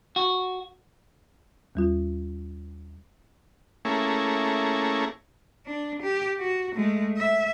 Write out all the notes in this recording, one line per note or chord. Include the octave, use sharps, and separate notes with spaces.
F#4
D#2 G3 F4
A3 A#3 C#4 E4 G#4
D4
G4
F#4
G#3 A3
E5